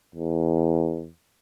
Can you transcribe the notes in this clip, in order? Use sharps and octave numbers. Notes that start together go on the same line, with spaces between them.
E2